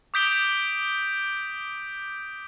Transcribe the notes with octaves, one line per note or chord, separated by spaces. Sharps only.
D6 D#6 G6 B6 D7 G7